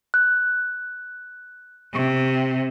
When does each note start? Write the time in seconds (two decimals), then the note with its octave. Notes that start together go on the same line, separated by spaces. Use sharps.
0.14 F#6
1.93 C3